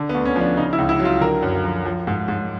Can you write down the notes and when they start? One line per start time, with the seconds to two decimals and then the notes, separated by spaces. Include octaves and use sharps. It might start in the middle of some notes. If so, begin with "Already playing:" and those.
Already playing: D3
0.09 B3
0.15 D2
0.25 C#4
0.36 F3 D4
0.57 C#3 D#4
0.73 E4
0.78 C#2
0.89 E4
1.00 F#3
1.05 F4
1.21 D3 A#4
1.43 F#2
1.64 F3
1.85 F3
2.07 G#2
2.28 G#2